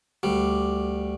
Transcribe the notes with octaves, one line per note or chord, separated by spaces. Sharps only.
D2 G3